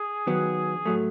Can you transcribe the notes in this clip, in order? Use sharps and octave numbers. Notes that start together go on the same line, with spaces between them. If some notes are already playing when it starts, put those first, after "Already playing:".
Already playing: G#4
D#3 F#3 B3
A2 F#3 A3